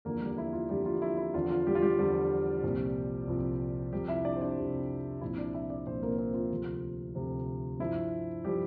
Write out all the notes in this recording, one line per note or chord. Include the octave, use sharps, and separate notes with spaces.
E2 D3 F3 A#3 A#4
G3 G4
E4
F4
E2 D3 F3 G3 G4
F4
E4
E4
E2 D3 F3 F4
F4
G3 G4
F4
G3 G4
E2 D3 F3 G3 G4
C2 A#2 F3
C2 A#2 F3
F2 C3 F3 G3 G4
E4 E5
D4 D5
C5
D4 D5
F2 C3 F3
C2 A#2 F3 E4 E5
D4 D5
E4 E5
D4 D5
C2 A#2 F3 C4 C5
A#3 A#4
C4 C5
F4
D2 C3 F3
D2 C3 F3
G2 F3 E4
F3 G3 G4